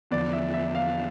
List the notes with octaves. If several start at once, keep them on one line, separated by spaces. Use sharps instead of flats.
E2 D3 F3 B3 D5
E5
E5
F5